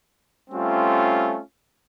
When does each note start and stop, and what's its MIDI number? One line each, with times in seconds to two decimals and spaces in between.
0.51 1.39 55
0.51 1.39 57
0.51 1.39 60
0.51 1.39 61
0.51 1.39 65